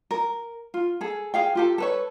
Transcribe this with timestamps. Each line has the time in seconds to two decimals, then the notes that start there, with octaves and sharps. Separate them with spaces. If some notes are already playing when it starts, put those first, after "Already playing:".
0.11 A#4
0.74 F4
1.01 G#4 A4
1.34 G#4 F5 G5
1.55 F4 G4 A4
1.78 A4 B4 C#5